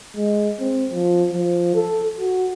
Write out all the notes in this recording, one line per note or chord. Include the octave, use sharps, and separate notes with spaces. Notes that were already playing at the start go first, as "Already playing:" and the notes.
G#3
C4
F3
F3
A4
F#4